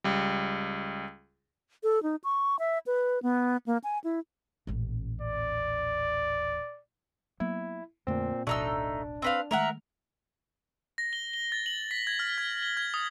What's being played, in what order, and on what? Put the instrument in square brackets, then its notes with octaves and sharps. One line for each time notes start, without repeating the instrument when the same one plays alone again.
[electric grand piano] C#2 G3
[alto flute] A4
D#4
C#6
E5
B4
B3
A#3
G#5
E4
[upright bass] D#1 A1
[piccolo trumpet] D5
[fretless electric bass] F#3 A#3 B3 [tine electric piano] E4
[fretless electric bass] F2 D3 A3 [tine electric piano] A#2 C4
[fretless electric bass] D1 A1 B2 [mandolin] A3 D#4 E6 [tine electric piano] D4
[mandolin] C4 B4 F5
[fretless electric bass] D#3 G#3 A3 [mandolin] A#4 E5 F#5
[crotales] A#6
G7
G7
A6
F#7
B6
G#6
F6
G#6
G7
G#6
D#6